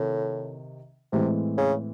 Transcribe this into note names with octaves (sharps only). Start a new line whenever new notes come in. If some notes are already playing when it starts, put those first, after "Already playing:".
Already playing: A2 C3 D#3
A2 C3 E3 G#3 C4
C#3